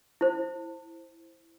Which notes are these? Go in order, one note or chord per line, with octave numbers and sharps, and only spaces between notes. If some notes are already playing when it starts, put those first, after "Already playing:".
E4 C5